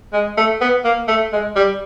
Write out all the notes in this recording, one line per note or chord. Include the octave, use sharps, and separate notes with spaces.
G#3
A3
B3
A#3
A3
G#3
G3